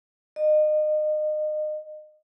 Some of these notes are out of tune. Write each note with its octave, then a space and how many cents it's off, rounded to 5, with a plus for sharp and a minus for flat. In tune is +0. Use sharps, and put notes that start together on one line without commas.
D#5 -30